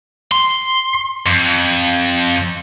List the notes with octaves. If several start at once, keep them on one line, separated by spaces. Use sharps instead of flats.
C6
F2